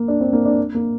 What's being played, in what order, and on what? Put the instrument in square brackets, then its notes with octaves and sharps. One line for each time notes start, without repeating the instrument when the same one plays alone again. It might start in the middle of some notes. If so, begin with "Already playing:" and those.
Already playing: [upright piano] A#3
D4
C4
A#3
D4
A#3